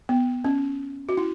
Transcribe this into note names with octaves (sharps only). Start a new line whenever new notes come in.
B3
C#4
F#4
E4